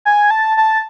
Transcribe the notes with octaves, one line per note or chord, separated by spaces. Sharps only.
G#5
A5
A5